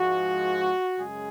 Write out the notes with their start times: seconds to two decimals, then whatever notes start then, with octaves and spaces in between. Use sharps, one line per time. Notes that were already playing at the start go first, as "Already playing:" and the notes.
Already playing: G#2 F3 G#3 F#4
0.98 F#2 C#3 G#3 G#4